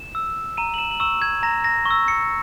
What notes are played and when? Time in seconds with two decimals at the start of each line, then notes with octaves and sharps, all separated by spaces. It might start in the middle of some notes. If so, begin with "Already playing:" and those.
Already playing: E7
0.15 E6
0.57 A#5 D#7
0.74 F#7
0.78 E7
0.91 F#7
1.00 C#6 E6 E7
1.22 G#6
1.43 A#5 A#6
1.64 A#6
1.85 C#6
1.91 E6
2.08 C#7